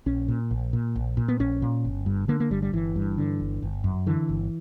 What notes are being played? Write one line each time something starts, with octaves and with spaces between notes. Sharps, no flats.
A#1 C#4
A#2
A#1
A#2
A#1
A#2
B3
A#1 C#4
A#2
G1
G2
D3 A#3
A#3
G1 G3
G3
G1 E3
G2
D3
G1
G1
F#2
D3 E3
G1